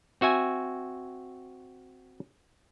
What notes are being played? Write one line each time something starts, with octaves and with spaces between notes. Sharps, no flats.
C4 F#4 E5 G#5